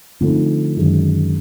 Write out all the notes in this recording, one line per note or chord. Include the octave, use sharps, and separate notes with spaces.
D3 F3 A3 C4 D#4
F#2 D#3 G#3